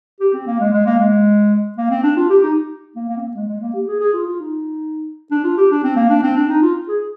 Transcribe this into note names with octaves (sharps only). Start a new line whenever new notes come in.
G4
C4
A#3
G#3
G#3
A#3
G#3
A#3
C4
D4
F4
G4
D#4
A#3
A#3
C4
A#3
G#3
G#3
A#3
G4
G#4
G#4
F4
F4
D#4
D4
F4
G4
D4
C4
A#3
D4
C4
D4
D#4
F4
G#4